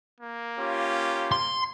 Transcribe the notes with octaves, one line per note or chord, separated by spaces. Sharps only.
A#3
C#4 F4 G4
C6